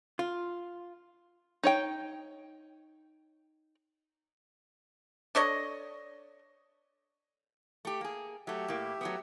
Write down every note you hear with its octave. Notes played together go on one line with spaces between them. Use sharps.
F4
D#4 C#5 G5
D4 A4 C#5 D#5
A3 G4
A#3 G#4
F#3 A3 G4 E5
A2 A#3
F#3 A3 B3